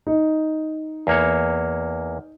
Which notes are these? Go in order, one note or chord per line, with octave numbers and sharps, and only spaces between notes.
D#4
E2 A#3 C#5